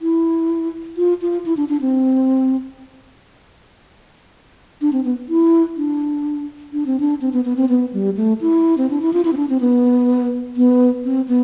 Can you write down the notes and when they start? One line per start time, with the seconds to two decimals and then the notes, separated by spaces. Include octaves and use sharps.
0.01 E4
0.97 F4
1.22 F4
1.46 E4
1.57 D4
1.69 D4
1.81 C4
4.81 D4
4.93 C4
5.05 B3
5.29 E4
5.77 D4
6.73 D4
6.86 C4
7.00 D4
7.21 C4
7.33 B3
7.45 B3
7.57 C4
7.69 B3
7.93 G3
8.17 A3
8.41 E4
8.78 C4
8.90 D4
9.02 E4
9.13 F4
9.25 E4
9.33 C4
9.37 D4
9.49 C4
9.61 B3
10.57 B3
11.05 C4
11.28 B3